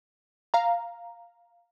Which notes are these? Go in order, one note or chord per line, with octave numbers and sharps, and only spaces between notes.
F5 A#5